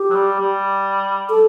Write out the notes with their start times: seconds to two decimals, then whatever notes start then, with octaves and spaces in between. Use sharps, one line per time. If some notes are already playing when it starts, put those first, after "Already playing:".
Already playing: G4
0.10 F#3
0.15 G3
0.40 G3
1.30 A4